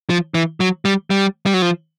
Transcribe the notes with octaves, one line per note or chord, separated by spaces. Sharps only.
F3
E3
F#3
G3
G3
G3
F#3
F3